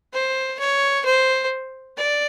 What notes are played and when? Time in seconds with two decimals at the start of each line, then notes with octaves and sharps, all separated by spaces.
0.13 C5
0.59 C#5
1.05 C5
1.97 D5